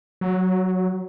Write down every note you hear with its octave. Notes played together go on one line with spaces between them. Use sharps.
F#3